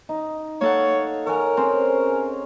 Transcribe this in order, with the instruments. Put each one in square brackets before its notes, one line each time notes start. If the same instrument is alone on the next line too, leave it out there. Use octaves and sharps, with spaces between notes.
[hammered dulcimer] D#4
[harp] A#3 A4 F#5 [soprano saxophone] C#5 [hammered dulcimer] F5
[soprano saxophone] A#4 [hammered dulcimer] C#5 F#5 G#5
[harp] C4 [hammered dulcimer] C#4 G#4 C5